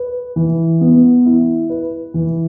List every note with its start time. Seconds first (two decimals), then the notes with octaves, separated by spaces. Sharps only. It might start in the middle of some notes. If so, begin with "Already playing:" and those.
Already playing: B4
0.36 E3
0.81 B3
1.26 E4
1.70 B4
2.14 E3